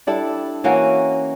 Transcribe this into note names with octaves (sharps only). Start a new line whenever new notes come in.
G3 D4 E4 A4
E3 A#3 C#4 F#4